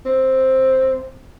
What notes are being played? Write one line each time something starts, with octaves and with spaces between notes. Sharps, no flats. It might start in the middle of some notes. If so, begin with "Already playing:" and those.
C4